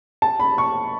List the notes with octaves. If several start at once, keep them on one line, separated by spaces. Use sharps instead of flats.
A5
B5
C#6